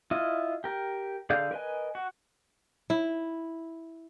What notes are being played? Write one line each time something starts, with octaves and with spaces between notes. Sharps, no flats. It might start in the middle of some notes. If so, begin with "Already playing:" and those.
E4 F4 D#5
G4 A#4
D3 G#4 D5 F5 G6
A#4 B4 D#5 G#5
F#4
E4